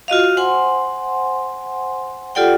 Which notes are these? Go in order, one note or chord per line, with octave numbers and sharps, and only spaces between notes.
F4 F#4 D#5 F5
C5 F#5 G#5 C6
F4 G4 A4 D5 F#5 G5